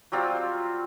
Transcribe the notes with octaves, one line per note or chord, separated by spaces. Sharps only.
F#3 G3 C4 F4